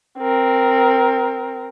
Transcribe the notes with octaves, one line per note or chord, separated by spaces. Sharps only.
C4 A#4